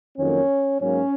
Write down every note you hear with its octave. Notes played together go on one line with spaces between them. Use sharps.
F2 D#3 F#3 A#3 C#4
G#2 F#3 A#3 C#4